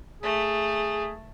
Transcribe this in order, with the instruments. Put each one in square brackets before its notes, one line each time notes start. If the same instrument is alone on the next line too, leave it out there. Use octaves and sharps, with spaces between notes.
[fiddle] A3 [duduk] G#4